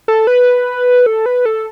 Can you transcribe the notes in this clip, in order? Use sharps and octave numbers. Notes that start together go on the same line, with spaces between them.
A4
B4
A4
B4
A4